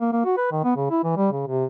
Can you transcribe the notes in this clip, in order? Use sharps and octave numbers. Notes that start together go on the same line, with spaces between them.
A#3
A#3
F#4
B4
D#3
B3
C#3
E4
E3
G3
C#3
C3